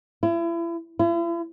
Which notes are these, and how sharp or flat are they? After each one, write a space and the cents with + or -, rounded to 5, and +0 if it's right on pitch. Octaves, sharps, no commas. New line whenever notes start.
E4 +35
E4 +45